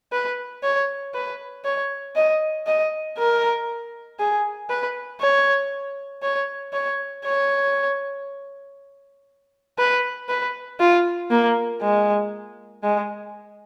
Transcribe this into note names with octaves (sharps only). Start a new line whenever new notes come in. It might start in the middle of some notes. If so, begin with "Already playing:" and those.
B4
C#5
B4
C#5
D#5
D#5
A#4
G#4
B4
C#5
C#5
C#5
C#5
B4
B4
F4
A#3
G#3
G#3